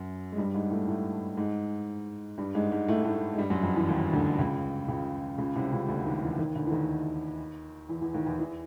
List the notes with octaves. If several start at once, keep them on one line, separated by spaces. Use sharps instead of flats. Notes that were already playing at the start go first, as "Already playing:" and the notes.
Already playing: F#2 F#3
G#3
G2 G3
G#2 G#3
A2 A3
A2 A3
G#2 G#3
G2 G3
G#2 G#3
G#2 G#3
A2 A3
A2 A3
G#3
G2 G3
F#2 F#3
F2 F3
E2 E3
D#2 D#3
D2 D3
C#2 C#3
C#2 C#3
C#2 C#3
C2 C3
C#2 C#3
D2 D3
D#2 D#3
E2 E3
D#2 D#3
D2 D3
E3
D#2 D#3
E2 E3
E2 E3
D#2 D#3
E2 E3
E2 E3